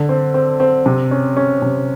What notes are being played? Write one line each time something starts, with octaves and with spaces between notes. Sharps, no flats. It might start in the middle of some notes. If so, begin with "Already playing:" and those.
Already playing: D3
C4
C4
C4
C3
C#4
C#4
C3